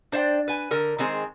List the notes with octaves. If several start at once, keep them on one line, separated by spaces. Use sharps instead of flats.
D4 C5 D5 F5 G5
B4 G#5
D3 A#4
D#3 G#3 C4 G#4